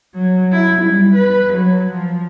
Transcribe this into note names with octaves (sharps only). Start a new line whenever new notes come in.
F#3
E4
G3
B4
F#3
F3